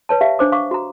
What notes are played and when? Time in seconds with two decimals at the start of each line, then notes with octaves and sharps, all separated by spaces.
0.09 B4 C#5 A5
0.21 G4 E5 F5
0.39 D4 C5 D6
0.52 F5 C#6 D6
0.71 F#4 A#5